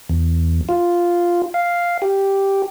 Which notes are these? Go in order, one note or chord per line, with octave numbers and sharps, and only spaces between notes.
E2
F4
F5
G4